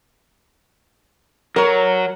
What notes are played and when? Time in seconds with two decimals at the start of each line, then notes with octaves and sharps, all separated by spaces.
1.56 F#3 A#4 C#5